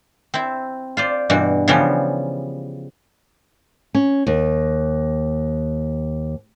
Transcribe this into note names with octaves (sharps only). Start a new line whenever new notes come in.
C4 E4
F4 C5 D5
G2 B2 E3 F#4
C#3 E3 F3 G3 B3 C#4
C#4
D#2